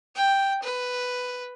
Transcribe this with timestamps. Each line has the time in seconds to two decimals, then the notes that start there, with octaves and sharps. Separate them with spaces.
0.16 G5
0.63 B4